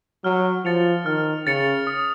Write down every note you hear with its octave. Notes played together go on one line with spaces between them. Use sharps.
F#3 F6
F3 A6 C#7 F7
D#3 F6
C#3 A6 C#7 F7
D#6